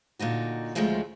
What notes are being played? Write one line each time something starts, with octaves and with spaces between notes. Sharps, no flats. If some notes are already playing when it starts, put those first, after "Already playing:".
A#2 D3 D#4 F#4
D2 D#3 F3 G#3 A3 C#4